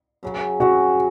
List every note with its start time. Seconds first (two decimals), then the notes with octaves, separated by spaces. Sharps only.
0.23 F#2 C#3 F#3
0.60 F#2 C#3 F#3 F#4